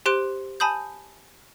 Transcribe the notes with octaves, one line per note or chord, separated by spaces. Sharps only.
G4 C5 C6 F#6 D7
G#5 A5 B5 D#6 G6